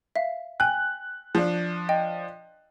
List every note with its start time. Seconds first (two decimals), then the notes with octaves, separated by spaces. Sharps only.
0.16 E5 F5
0.60 G5 G#5 F#6
1.35 F3 D4
1.89 D#5 G5